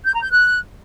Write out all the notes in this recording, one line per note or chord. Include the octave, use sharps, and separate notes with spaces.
G6
A#5
G6
F#6